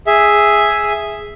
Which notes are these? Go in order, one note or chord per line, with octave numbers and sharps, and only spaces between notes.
G#4 E5